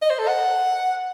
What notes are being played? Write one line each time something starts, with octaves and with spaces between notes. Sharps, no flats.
D#5
C5
A4
F#5